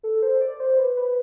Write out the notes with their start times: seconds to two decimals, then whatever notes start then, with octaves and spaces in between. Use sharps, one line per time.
0.03 A4
0.22 C5
0.41 D5
0.60 C5
0.79 B4
0.96 B4